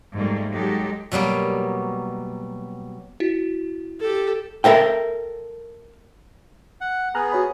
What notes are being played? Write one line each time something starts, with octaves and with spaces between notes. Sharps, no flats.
F2 G#2 G3 A3 A#3
F#3 G#3 D#4 G4 A4
B2 F#3 G3 A#3
E4 F#4
G4 A4
A4 A#4 E5 G5
F#5
B3 G#4 A#5 F6 F#6
F#4 C#5 B5